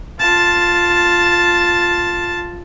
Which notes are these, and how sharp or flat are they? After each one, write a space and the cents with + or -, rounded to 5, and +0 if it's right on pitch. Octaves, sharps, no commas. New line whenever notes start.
F4 +0 A5 +0